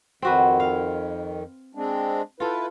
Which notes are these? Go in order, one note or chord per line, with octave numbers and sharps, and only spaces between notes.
F2 D#3 C4 F#4 B4
F5
G#3 C4 D4
E4 F4 A4 B4